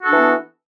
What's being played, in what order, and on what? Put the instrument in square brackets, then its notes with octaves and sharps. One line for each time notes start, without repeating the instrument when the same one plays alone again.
[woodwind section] F#4
A4
D4
E3
B3